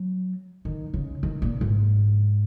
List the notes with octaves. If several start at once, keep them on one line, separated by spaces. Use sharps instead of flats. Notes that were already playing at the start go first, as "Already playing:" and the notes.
Already playing: F#3
D#3
C#3
D#3
A#2
G#2